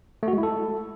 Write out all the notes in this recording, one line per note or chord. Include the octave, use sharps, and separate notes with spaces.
A3
F#4
G#3
E4
A4